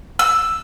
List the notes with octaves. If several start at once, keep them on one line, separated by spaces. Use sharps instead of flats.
E6